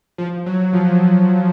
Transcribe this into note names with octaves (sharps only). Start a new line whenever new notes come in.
F3
F#3
F3